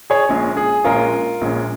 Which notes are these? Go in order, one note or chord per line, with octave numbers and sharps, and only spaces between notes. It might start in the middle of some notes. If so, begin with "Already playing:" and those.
G#4 C#5
A#1 A#2 G#3 C#4
G#4
A#1 A#2 G#3 C#4 F4 A#4
A#1 A#2 G#3 C#4